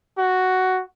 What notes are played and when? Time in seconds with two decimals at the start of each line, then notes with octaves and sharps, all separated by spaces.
0.18 F#4